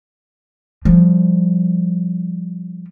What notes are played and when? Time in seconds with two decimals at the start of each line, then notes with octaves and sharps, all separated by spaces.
0.85 F3 G3